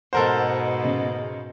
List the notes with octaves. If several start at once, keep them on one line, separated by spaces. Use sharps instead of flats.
G#2 B2 A4 A#4 C5 F#5
C#3